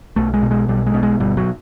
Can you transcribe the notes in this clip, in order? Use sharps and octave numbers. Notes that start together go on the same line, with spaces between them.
B1 A3
G#3
B2
G#3
B1 G3
G#3
B2
G#3
G1 G3
F#3